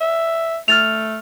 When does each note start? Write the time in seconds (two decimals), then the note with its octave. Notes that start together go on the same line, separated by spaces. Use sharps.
0.01 E5
0.68 A3 F6 A6 F7